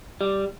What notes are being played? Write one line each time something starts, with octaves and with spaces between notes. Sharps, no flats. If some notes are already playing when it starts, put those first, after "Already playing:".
G3